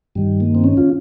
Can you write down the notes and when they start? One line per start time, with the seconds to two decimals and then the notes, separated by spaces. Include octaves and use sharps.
0.15 G2 D#3 G3
0.40 A#3
0.55 C4
0.64 C#4
0.77 F4